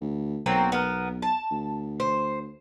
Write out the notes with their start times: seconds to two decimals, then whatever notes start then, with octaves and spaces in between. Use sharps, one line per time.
0.01 D2
0.46 B1 F#3 A#3 C4
0.72 B3 A#4
1.22 A5
1.51 D2
2.00 C5